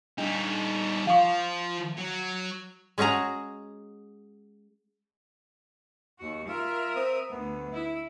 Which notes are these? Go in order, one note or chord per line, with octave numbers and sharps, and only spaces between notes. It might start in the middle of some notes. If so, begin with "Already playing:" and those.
G3 D4 D#4
F3 F5 C#6
F#3
G#3 C#4 F#4 G#4 A#5
D#2 F#4
F4 A#4 E5
C4 D#6
D2 B3
E4